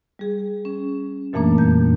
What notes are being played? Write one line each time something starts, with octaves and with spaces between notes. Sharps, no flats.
G3 G#4
C#4
F#2 A#2 E3 A3 A#3 D4
F2 G3 G6